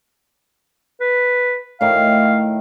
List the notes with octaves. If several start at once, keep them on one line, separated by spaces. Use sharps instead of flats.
B4
A2 D#3 F5